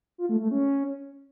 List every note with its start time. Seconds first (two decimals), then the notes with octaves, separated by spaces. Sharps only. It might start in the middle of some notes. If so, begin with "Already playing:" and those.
0.18 F4
0.29 A3
0.40 A3
0.51 C#4